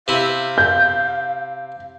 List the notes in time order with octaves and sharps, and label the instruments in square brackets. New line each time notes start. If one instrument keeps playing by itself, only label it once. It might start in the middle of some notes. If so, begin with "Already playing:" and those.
[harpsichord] C3 E4 [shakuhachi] F5
[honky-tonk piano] G6